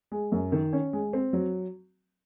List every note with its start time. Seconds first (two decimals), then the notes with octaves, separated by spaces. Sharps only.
0.12 G#3
0.32 F#2
0.52 D#3
0.73 C#4
0.93 G#3
1.13 C4
1.33 F#3